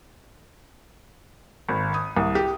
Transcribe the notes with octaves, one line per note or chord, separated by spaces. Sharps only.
G#1
D#6
C2
G4